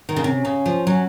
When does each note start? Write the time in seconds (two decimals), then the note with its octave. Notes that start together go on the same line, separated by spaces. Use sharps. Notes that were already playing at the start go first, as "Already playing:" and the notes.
0.09 D#3
0.16 C#3
0.24 C3 C#4
0.45 C#3
0.66 F3
0.87 F#3